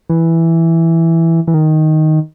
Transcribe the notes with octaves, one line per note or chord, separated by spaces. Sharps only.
E3
E3
D#3